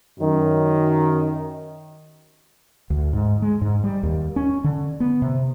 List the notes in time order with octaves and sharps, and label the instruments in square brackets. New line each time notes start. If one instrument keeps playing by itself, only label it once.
[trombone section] F#2 D#3
[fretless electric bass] D2
G#2
G#3
G#2
G3
D#2
C#4
D3
B3
C3